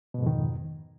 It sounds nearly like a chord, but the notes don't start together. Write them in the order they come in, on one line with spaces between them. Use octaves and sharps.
B2 G#2 F2 D#3